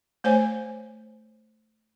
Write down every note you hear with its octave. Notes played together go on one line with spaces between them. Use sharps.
A3 C5 C#5 G#5